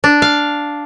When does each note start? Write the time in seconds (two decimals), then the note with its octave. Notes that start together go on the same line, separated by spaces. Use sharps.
0.04 D4
0.22 F5